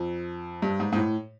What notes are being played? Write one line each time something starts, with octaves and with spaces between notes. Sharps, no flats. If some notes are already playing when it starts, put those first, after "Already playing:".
Already playing: F2
G2
G#2
G#2
A2